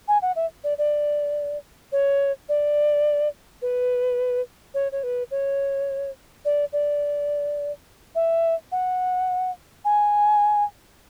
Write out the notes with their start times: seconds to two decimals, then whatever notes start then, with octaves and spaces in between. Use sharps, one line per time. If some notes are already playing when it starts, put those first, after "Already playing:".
0.08 G#5
0.22 F#5
0.36 E5
0.64 D5
0.78 D5
1.92 C#5
2.49 D5
3.62 B4
4.74 C#5
4.92 C#5
5.03 B4
5.31 C#5
6.45 D5
6.73 D5
8.15 E5
8.72 F#5
9.85 G#5